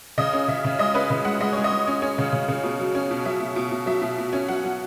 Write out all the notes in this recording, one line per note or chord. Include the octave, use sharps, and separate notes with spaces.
C#3 D#5
C#4
C#3 E5
C#3
G#3 D#5
C#4 B4
C#3 B4
G#3 F#5
G#3 D#5
G#3 C#5
D#5
G#3
C#4
C#4
C#3
C#3
C#3
B2
F#3
C#4
B2
F#3 E5
B2
B2
B2
F#3 E5
B2
B2
C#4
F#3 F#5
F#3